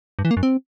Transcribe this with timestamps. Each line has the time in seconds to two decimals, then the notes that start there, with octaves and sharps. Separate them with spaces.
0.19 G2
0.25 E3
0.31 A#3
0.37 F#2
0.43 C4